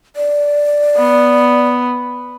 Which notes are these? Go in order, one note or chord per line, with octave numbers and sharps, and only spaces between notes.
D5
B3